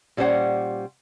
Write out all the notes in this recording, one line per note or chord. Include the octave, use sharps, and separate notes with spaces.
A#2 G3 C#4 C5 F#5